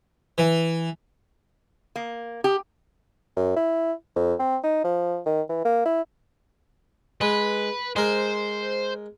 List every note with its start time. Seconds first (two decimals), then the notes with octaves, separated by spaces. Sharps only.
0.38 E3
1.96 A#3
2.44 G4
3.36 F#2
3.56 E4
4.16 F2
4.39 C4
4.63 D#4
4.84 F3
5.26 D#3
5.49 E3
5.64 A#3
5.85 E4
7.21 G#3 B4
7.96 G#3 A#4 C5